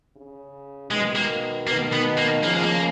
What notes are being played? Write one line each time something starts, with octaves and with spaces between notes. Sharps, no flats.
C#3
B2 D#3 G#3
A#3
B2 D#3 A#3
B3
A#3
C#3 F3 A#3
G#3
A#3